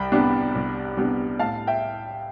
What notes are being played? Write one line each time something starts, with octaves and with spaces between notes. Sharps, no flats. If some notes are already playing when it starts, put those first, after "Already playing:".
Already playing: C2 G5 B5
C3 G3 B3 D4
C2
C3 G3 B3 D4
A2 F5 A5
E5 G5